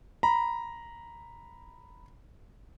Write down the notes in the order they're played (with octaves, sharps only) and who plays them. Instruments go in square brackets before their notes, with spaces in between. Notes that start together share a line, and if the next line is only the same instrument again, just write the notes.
[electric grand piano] A#5 B5